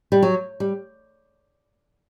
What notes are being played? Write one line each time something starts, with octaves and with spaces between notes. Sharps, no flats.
G3
F#3
G3